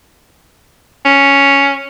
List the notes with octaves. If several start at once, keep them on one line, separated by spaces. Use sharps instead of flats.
C#4